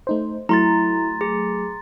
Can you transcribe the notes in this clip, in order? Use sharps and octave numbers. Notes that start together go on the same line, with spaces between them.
A3 D#4 C5
F#3 A3 E4 A#5 C6 A6
G#4